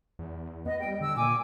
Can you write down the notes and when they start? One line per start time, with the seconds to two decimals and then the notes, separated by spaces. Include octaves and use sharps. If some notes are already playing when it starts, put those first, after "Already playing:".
0.19 E2
0.66 B3 D#5
0.80 G3 G5
1.01 D3 E6
1.16 A#2 G#5 D6